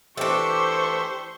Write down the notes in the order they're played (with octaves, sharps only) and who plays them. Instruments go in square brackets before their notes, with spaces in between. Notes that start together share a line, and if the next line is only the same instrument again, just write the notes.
[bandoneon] E3 G4 E6 [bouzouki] A3 D4 [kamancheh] C5 C#6